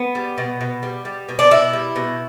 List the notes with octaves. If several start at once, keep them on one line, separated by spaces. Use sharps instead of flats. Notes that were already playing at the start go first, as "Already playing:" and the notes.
Already playing: B3
G3
B2
B2
G3
G3
B2
D4
B2 E4
G3
B2